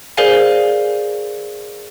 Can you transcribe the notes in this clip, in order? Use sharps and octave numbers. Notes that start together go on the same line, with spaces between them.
G#4 A#4 C5 D5 F5 G#5